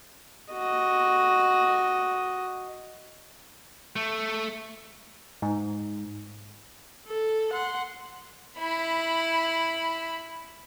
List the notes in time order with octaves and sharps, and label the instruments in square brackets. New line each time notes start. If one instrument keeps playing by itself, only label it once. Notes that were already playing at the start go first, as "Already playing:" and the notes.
[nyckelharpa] F#4 D#5
[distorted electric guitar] A3
[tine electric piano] G#2
[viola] A4
F#5 C6
[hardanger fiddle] E4 B5